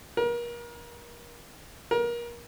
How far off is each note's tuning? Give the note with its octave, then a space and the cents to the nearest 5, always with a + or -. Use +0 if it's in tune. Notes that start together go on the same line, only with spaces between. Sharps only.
A#4 +35
A#4 +30